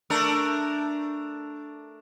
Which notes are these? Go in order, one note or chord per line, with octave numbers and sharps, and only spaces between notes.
A3 D4 A#4